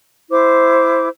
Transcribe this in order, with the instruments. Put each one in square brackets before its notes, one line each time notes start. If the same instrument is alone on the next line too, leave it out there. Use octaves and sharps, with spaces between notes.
[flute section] E4 C5 D6